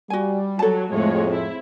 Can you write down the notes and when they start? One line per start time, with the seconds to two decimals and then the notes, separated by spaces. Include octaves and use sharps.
0.10 G3 F#4 G#5
0.59 F#3 F#4 A4 A5
0.92 F2 A2 G#3 A3 C#5
1.27 C4 E4